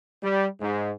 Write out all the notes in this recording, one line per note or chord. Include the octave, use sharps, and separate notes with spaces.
G3
G#2